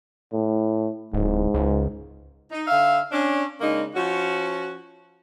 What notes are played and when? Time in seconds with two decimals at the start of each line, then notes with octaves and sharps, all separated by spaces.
0.33 A2
1.13 D1 G#2
1.54 C#2
2.51 D#4
2.67 D3 E5 F5
3.12 C#4 D4
3.61 C#3 G#3 A#3 D4 D#4
3.94 F3 C#4 F#4